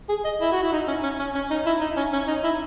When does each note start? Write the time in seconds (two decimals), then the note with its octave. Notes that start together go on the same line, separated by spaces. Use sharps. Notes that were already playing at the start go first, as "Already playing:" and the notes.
0.09 G#4
0.25 D#5
0.41 E4
0.52 F#4
0.63 E4
0.72 D#4
0.88 C#4
1.03 C#4
1.19 C#4
1.35 C#4
1.51 D#4
1.66 E4
1.81 D#4
1.97 C#4
2.13 C#4
2.28 D#4
2.44 E4